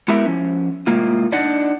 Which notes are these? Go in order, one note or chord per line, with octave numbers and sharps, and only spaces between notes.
G#3 B3 E4 G4 A#4 E5
F3 C#4
A2 C3 G#3 A#3 F4
D4 D#4 D5 D#5 F#5